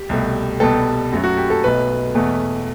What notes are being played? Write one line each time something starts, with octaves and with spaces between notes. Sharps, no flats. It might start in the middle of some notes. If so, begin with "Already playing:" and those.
Already playing: G4
C2 B2 A3
C2 B2 G3 B3 A4
F#2 F#3 A3
F#4
G4
A4
B1 B2 A3 B4
E2 B2 A3